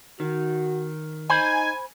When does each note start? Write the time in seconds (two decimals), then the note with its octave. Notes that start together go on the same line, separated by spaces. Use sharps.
0.20 D#3 F#4
1.30 D#4 C5 G#5 B5